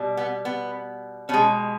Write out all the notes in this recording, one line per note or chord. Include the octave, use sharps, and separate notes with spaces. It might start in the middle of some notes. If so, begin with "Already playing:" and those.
Already playing: B2 G3
B3
B3
B2 G#3 C#4